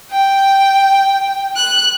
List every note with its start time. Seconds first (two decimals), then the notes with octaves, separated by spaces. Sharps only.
0.10 G5
1.56 F#6